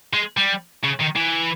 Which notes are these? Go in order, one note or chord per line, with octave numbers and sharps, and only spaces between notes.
G#3
G3
C#3
D#3
E3